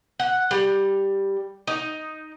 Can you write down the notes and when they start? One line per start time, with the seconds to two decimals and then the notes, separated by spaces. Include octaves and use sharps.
0.19 F#5
0.51 G3
1.67 D#4